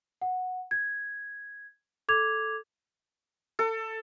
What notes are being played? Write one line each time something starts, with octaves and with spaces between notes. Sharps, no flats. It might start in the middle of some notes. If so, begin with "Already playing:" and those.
F#5
G#6
A4 D6 G#6 F7
A4